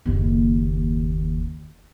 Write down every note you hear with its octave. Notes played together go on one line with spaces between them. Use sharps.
F#1 D#2